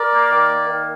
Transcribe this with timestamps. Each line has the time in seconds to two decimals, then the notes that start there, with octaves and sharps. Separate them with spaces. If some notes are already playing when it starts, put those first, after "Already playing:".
Already playing: A#4 D5
0.12 A#3
0.31 D#3
0.49 A#3
0.69 D#3